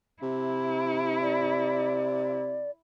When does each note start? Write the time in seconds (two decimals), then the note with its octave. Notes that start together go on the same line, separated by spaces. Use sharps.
0.22 C3 E4
1.22 D5